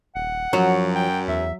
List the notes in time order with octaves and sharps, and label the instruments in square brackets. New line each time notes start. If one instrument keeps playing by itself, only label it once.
[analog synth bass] D#1 [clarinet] F#5
[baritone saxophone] F#2 [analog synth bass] F3 [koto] F#3
[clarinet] G5
[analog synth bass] E2 [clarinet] E5